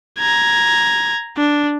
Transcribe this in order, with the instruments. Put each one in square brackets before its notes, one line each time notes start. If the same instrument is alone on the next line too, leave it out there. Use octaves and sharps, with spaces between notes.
[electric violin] A#5 G#6
D4